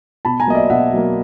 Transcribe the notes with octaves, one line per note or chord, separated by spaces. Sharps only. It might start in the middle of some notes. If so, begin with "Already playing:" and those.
B2 A5 B5
G#5 A#5
F#3 A#3 D#5
D5 E5
B2 E5 F#5
F#3 A#3